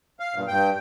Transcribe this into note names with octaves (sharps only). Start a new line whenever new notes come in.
F5
G2 A#2
G2 G5